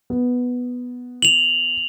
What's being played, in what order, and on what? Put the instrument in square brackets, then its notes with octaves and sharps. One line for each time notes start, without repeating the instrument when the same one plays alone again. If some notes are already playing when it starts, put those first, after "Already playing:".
[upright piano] B3
[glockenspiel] F7 F#7